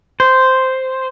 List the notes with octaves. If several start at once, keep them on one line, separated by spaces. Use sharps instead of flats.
C5